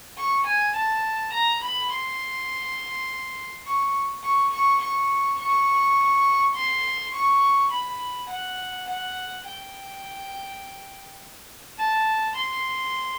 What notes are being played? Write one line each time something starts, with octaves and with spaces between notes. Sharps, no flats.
C#6
G#5
A5
A#5
B5
C6
C#6
C#6
C#6
C#6
C#6
C6
C#6
B5
F#5
F#5
G5
A5
C6